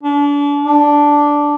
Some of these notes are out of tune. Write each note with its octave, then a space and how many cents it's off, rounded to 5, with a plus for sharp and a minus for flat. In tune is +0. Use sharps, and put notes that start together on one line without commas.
D4 -35
D4 -5